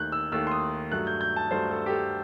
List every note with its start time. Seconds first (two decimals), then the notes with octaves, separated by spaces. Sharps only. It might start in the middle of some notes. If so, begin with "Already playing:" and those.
Already playing: D#2 D#3 A3 F#6 G6
0.12 E6
0.32 D#2 D#3 A3 E6
0.47 C6
0.51 D#6
0.91 G2 F#3 A3 F#6
1.07 G6
1.21 G6
1.36 A5
1.51 G2 F#3 A3 C5
1.71 A4
1.86 G4
1.90 A4